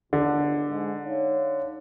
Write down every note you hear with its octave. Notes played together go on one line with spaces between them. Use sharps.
G1 C#2 D3 D#3
G#2
D#4 C#5 F5